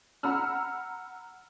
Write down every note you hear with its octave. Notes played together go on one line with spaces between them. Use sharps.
F#5 A#5 B5 E6 F6